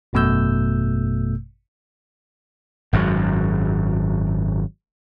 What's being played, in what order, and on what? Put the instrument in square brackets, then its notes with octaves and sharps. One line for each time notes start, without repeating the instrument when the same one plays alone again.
[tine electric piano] G#1 F#2 B2 A3 E6 G6
[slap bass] G#1 F#2 C#3 F#3